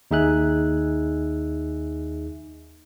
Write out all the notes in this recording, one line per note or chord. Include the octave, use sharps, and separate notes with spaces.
D#2 D#4 G#4 E5 G#5 F#6